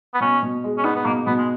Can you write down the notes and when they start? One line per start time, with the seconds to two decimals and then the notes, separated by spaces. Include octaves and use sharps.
0.14 B3
0.20 B2 C#4
0.43 B2
0.64 G#3
0.78 C#4
0.84 B3 D#4
0.96 B3
1.05 B2 A#3
1.27 B2 B3
1.38 G#3